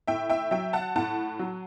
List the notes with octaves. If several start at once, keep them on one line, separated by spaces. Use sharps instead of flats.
A2 E5 G5
E5 G5
F#3 E5 G5
F#5 A5
A2 F#5 A5
F#3